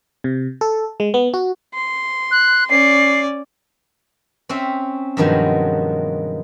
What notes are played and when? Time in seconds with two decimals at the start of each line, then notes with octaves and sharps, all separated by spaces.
0.24 C3
0.61 A4
1.00 G#3
1.14 B3
1.34 F#4
1.74 C6
2.31 F#6
2.70 C#4 D5 C7
4.49 C4 C#4 C5 E5
5.17 G2 B2 D#3 F3 F#3 G#3